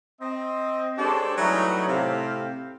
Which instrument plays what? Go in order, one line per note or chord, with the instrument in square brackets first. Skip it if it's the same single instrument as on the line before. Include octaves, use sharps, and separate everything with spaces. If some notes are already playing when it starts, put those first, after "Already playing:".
[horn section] C4 D#5
G#3 D4 G4 A4 C5 C#5
E3 F#3 G3 A3 C#4 D#4
A2 C3 C4 G4 F5